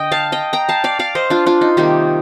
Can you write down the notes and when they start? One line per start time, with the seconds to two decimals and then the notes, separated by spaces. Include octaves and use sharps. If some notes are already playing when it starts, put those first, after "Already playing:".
Already playing: D3 D#5 G5
0.11 F5 A5
0.32 D#5 G5
0.53 G5 A#5
0.69 F5 A5
0.84 D5 F5
0.99 D5 F5
1.15 C5 D#5
1.30 D4 F4
1.46 D4 F4
1.61 D#4
1.77 C3 D#3 G3 A#3 D#4 G4